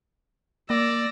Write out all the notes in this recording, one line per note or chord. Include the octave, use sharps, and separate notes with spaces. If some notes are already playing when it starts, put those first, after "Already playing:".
A#3 D5 E6 A#6